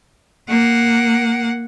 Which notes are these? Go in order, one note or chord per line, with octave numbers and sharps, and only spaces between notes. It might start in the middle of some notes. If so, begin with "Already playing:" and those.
A#3 F#5